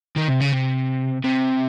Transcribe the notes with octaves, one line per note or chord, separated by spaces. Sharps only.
D#3
C3
C#3
C3
C3